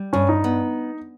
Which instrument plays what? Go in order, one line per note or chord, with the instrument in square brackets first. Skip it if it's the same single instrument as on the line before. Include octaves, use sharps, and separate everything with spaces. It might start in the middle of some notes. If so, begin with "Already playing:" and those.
Already playing: [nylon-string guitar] G3
[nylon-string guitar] G2 [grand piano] C#4
[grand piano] D#4
[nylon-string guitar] B3